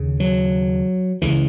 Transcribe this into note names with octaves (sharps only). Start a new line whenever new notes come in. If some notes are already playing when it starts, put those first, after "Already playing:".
Already playing: D#2 C#3
F#3
C#2 C#3 E3